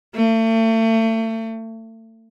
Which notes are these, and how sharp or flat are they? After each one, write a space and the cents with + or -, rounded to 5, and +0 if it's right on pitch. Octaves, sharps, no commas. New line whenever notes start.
A3 +35